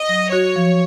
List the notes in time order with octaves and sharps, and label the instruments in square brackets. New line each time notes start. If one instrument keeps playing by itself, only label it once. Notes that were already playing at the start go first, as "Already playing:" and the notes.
Already playing: [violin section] D#5
[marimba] F#3
[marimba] F#4 [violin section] C#5
[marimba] F3